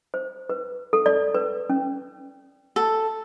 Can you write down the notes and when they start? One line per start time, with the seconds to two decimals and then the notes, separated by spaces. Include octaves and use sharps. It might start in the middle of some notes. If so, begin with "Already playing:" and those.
0.14 C5
0.49 B4
0.93 A4
1.06 D5
1.34 B4
1.70 C#4
2.76 A4